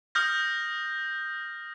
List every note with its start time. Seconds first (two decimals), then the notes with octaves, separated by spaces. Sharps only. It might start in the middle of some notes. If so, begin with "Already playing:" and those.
0.15 D#6 F6 G6 A#6